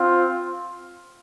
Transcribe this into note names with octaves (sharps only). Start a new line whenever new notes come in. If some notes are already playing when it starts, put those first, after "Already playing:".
Already playing: C4 F4